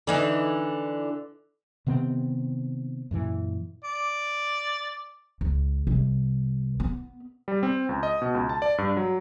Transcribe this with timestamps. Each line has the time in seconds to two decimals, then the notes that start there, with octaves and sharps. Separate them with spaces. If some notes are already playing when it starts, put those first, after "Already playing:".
0.07 D3 E3 D#4
1.87 C3 D#3 B3 C4
3.11 F#2 A#2 E3
3.84 D5
5.41 C#2
5.87 C2
6.80 B3
7.48 G3
7.63 C4
7.89 C#2
8.03 D#5
8.22 B2
8.35 C#2
8.49 A5
8.62 D5
8.78 G2
8.97 F#3